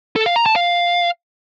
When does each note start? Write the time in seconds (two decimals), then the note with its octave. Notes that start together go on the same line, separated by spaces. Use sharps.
0.16 A4
0.26 F5
0.36 A#5
0.46 A5
0.56 F5